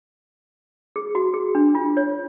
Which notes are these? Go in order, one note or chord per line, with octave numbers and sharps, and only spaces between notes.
G#4
F#4
G#4
D4
F4
C#5